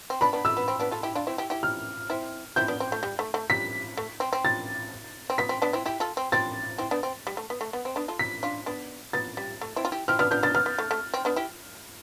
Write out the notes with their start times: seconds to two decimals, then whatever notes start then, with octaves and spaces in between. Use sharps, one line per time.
0.10 C4
0.21 B3 D4 B5
0.33 B3 D4
0.45 A3 E6
0.57 B3
0.68 C4
0.80 B3 D4
0.91 F4 A4
1.03 E4 G4
1.15 D4 F4
1.27 C4 E4
1.38 E4 G4
1.50 E4 G4
1.63 F6
2.10 C4 E4
2.56 C4 E4 G6
2.68 B3 D4
2.80 C4
2.92 A3
3.03 G3
3.19 A3
3.34 A3
3.50 G3 B6
3.97 A3
4.20 C4
4.33 C4
4.45 A6
5.30 C4
5.38 B3 B6
5.49 C4
5.62 B3 D4
5.73 C4 E4
5.86 E4 G4
6.00 F4 A4
6.17 C4
6.32 C4 A6
6.78 C4 E4
6.91 B3 D4
7.03 C4
7.27 G3
7.37 A3
7.50 B3
7.61 A3
7.73 B3
7.85 C4
7.96 B3 D4
8.08 F4 A4
8.19 B6
8.43 D4 F4
8.66 B3 D4
9.13 B3 A6
9.37 G3
9.61 A3
9.76 C4 E4
9.85 F4
9.92 E4 G4
10.08 C4 E4 F6
10.19 B3 D4 F6
10.31 B3 D4 G6
10.43 B3 D4 A6
10.55 B3 F6
10.66 B3
10.79 A3
10.91 A3
11.14 C4
11.25 B3 D4
11.36 E4 G4